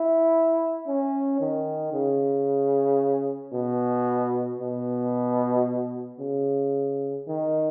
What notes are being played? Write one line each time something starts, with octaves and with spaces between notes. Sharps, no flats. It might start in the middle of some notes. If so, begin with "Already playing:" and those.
Already playing: E4
C#4
D#3
C#3
B2
B2
C#3
D#3